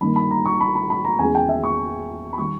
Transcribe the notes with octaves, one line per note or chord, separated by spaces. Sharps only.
G2 D#3 A#3 B5
B5
A#5
C#6
B5
B5
B5
A#5
E2 C#3 G#3 G#5
G5
E5
C#6
B5
D#3 G3 C#6